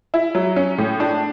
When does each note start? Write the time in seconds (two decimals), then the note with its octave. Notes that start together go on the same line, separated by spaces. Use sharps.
0.14 E4
0.35 F#3
0.56 C#4
0.78 A2
1.00 D4